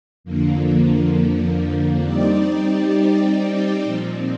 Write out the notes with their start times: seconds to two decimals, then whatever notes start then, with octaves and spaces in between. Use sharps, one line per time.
0.24 F2 D3 F3 A#3
2.04 G3 C4 D#4 G4 D5
3.84 A#2 F3 C4